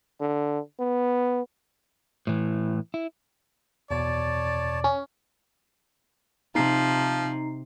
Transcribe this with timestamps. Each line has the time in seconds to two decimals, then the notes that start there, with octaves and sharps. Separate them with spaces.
0.20 D3
0.79 B3
2.27 A2 E3
2.94 E4
3.91 E2 B2 C#5 D5 A5
4.84 C#4
6.55 C3 F3 D#4 C7